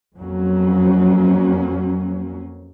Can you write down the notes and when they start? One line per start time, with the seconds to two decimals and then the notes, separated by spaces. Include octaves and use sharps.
0.18 F2 F#3 A#3 C#4